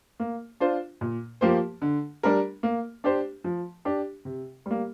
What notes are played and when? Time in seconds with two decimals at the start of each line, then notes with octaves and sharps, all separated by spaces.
0.20 A#3
0.60 D4 F4 C5
1.01 A#2
1.41 F3 A#3 G4 C5
1.82 D3
2.23 G3 D4 A#4
2.63 A#3
3.04 D4 G4 C5
3.44 F3
3.85 D4 G4
4.25 C3
4.66 G3 A#3